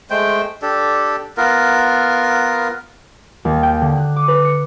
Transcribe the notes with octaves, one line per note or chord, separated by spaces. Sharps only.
G#3 A3 C5 G5
D4 G4 A4
B3 F4 A#4
D#2
G5
D3
F#6
D6
B4
C#7